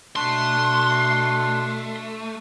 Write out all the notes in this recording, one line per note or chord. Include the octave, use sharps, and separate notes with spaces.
B2 A3 D4 C6